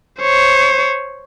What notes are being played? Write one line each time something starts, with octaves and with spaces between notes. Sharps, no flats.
C5 C#5